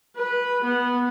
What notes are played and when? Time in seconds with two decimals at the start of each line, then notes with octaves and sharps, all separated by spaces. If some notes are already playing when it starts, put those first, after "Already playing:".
0.16 B4
0.64 B3